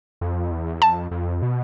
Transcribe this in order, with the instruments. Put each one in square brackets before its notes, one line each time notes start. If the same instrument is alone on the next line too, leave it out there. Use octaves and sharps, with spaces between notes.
[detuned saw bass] F2
E2
[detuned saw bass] F2 [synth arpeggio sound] A5
[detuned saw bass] F2
B2